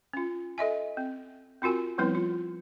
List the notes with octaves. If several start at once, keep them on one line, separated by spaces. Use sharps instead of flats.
C#4 F4
A4 D#5 E5 G#5
C4
C4 F4 F#4 A#4 G#5
F3 G3 B3 C4 E4 B4
F4